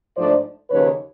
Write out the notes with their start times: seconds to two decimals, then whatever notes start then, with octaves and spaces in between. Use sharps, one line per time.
0.16 G#2 F3 A3 D4 C5 D5
0.70 D#2 C#3 F3 B4 C#5